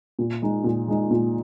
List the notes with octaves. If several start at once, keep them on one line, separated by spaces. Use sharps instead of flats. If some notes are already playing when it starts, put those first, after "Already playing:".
A#2
G#3 D#4
A#2
G#3 D#4
A#2